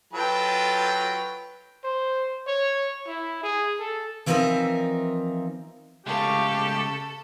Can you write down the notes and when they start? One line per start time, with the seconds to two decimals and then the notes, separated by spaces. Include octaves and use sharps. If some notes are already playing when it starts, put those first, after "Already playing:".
0.13 F#3 F4 A4 B4 G5
1.84 C5
2.47 C#5
3.07 E4
3.43 G#4
3.80 A4
4.26 E3 F3 C4 D#4 A#4 E5
6.07 C#3 G#3 A3 G4 A4 F5 C#6